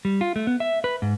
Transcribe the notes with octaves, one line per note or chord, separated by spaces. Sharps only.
G3
F4
A3
B3
E5
B4
G#2